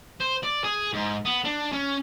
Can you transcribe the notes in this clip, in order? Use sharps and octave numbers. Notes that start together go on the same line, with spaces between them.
C5
D5
G#4
G#2
B3
D4
C#4